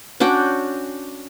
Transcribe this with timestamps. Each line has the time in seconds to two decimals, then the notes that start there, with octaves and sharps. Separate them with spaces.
0.20 C#4 D4 F#4 G5